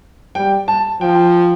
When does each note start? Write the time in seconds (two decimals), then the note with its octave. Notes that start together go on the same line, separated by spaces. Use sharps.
0.35 G3 G5
0.68 A5
1.01 F3 G5